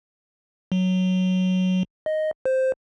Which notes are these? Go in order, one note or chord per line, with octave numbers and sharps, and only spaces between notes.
F#3
D#5
C5